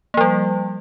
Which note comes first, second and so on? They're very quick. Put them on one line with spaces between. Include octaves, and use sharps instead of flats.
A#3 F3 G3